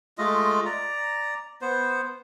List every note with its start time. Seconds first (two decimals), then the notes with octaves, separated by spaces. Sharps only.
0.18 G#3 A3 F4 D#5
0.66 D5 A#5
1.61 B3 C5